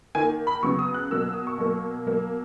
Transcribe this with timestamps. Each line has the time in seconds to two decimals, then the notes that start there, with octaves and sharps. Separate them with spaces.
0.15 D#3 A#3 G#5
0.47 B5
0.63 C#3 F#3 B3 C#6
0.79 D#6
0.94 F#6
1.11 B2 F#3 A#3 E6
1.22 E6
1.34 D#6
1.47 C#6
1.58 B2 F#3 A#3
2.06 B2 F#3 A#3